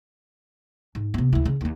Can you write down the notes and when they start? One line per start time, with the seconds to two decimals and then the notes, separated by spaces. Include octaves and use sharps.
0.95 G#2
1.14 C3 B3
1.33 D2 E4
1.45 C#3
1.61 D#2 B3